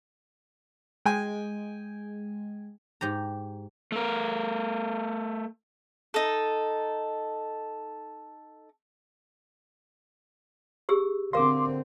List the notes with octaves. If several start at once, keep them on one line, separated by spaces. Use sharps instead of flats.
G#3 G5 G#5
G#2 G4 A#5
A3 A#4
D#4 A4
G4 G#4 E6
D3 C4 A#4 F5 C6 D6